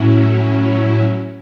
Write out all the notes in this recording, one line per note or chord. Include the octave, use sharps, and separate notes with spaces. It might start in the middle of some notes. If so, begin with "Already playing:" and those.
Already playing: A2 F#3 C#4 E4